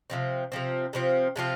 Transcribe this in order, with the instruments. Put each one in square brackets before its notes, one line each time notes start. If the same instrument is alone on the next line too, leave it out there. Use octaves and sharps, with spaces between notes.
[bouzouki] C3 F3 C4
C3 F3 C4
C3 F3 C4
C3 F3 C4 F4